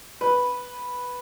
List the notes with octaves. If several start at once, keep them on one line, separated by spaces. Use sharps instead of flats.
B4